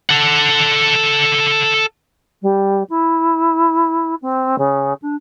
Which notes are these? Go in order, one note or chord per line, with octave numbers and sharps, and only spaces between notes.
A4 F#5
G3
E4
C4
C#3
D4